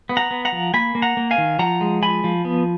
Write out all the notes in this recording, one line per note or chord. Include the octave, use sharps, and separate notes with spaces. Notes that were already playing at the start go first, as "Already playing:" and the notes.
B3
F#5 A#5
B3
F#5 A#5
F3
A#3 G#5 B5
A#3
F#5 A#5
A#3
F5 G#5
D#3
F3 F#5 A#5
G#3
F3 G#5 B5
F3
B3